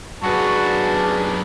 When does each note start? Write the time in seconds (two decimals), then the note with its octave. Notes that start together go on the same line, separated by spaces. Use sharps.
0.23 F#2 D4 F#4 G#4 B4 A5